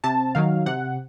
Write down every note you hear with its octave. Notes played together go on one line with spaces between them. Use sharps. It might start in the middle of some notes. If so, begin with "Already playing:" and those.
C3 A5
D#3 F#3 F5
C3 F#5